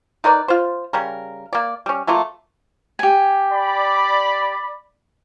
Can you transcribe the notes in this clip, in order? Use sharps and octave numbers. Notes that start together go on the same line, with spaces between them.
D#4 A#4 B4 D5
F4 C5
C#3 G3 A#4
A#3 D5
G3 C#4
F#3 A3 A#3 F4
G4 G#5
D5 B5